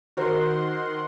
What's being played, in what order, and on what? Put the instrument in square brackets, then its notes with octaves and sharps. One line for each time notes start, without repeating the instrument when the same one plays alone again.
[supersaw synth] D#3 F#5 C6 [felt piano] F#4 A#4 C5